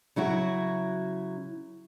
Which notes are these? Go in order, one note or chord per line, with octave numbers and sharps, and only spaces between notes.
C#3 F#3 E4 F#4